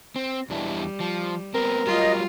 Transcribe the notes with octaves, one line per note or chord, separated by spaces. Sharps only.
C4
E2 G3 D4 E4
F3
B3 C4 A#4
F#3 G3 F4 D#5